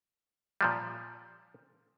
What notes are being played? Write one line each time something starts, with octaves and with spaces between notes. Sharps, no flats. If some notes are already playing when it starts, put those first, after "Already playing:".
A#2 F3 G3